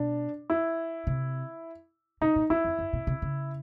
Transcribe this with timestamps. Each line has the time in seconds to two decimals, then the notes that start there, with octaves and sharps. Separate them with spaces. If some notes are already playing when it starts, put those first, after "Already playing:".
Already playing: B2 D4
0.50 E4
1.07 C3
2.21 B2 D#4
2.36 A#2
2.50 E2 E4
2.65 F2
2.79 F#2
2.93 B2
3.07 C3
3.22 C#3